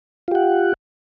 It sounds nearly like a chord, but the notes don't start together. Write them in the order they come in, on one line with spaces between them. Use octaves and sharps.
F4 G4 F#5